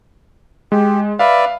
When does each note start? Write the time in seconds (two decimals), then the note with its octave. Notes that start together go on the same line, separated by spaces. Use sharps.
0.72 G#3 G4
1.19 B4 D5 E5 F5